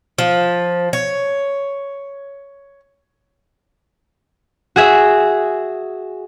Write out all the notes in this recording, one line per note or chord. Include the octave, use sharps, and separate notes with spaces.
F3
C#5
F#4 G#4 E5